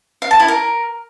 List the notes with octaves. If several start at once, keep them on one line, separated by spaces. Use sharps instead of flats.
F5
A5
E4
A#4